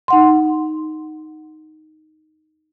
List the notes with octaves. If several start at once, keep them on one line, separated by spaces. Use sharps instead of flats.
D#4 F#5 C6